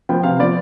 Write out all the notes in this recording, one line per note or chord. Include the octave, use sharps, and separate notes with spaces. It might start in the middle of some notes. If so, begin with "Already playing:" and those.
F3 B3 G5
C3 F5
F3 B3 D5